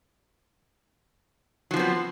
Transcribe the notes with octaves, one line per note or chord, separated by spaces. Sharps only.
F3 F#3 B3 C4